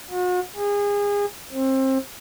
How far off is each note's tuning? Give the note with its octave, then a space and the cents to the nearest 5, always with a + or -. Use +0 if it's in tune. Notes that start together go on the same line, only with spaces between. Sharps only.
F#4 -40
G#4 -30
C4 +25